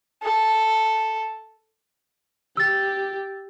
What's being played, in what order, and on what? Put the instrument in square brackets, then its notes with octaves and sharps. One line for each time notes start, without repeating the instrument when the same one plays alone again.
[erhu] A4
[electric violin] G4 [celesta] E6 A6